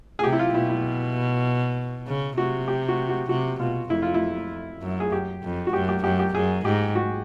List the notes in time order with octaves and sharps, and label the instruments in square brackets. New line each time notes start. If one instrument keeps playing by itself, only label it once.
[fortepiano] G#4
[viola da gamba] C3 [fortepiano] G4
[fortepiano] E4
F4
[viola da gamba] B2 [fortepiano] E4
[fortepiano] E4
[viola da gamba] C#3
[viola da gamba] C3 [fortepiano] F#4
[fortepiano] G4
F#4
F#4
[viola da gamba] C3 [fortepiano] F#4
[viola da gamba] B2 [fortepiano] F4
[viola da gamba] F2 [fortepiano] E4
[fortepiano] F4
E4
[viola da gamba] F#2
[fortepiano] G#4
G4
[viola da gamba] F2
[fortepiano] F#4
[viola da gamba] F#2 [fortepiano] G4
[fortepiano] G4
[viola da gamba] F#2 [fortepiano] G4
[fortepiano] G4
[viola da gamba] F#2 [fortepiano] G#4
[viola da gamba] G#2 [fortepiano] G4
[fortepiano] F#4